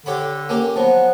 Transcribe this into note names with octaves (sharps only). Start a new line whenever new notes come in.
D3 G4 C#5 B5
A#3 C#4 G4
F3 F#3 B3